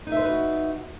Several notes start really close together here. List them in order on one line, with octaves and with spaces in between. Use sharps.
D#4 E5 C5 B4 F#4